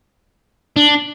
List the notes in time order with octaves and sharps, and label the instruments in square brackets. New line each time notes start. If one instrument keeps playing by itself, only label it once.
[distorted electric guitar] D4